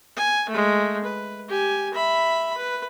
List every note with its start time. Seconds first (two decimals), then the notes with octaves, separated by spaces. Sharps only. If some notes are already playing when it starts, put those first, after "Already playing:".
0.17 G#5
0.49 G#3 A3
1.04 B4
1.48 G4 G#5
1.94 E5 B5
2.57 B4